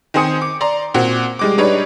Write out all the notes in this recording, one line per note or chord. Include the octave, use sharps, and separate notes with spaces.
D#3 C4 C5 G#5 D#6 C#7
D6
D5 A#5 C6
A#2 C4 F#4 F#5
G3 G#3 D6
G3 D4 D#4 B4 C#5 D5